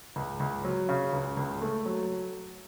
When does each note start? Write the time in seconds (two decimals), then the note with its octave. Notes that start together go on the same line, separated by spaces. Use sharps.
0.16 C#2
0.40 C#2
0.65 F#3
0.89 C#3
1.13 C#2
1.37 C#2
1.61 A3
1.86 F#3